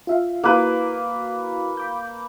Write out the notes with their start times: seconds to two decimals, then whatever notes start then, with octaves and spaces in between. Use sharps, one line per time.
0.07 F4 E5 F5
0.44 A#3 E4 F#4 B4
1.77 B5 D6 G6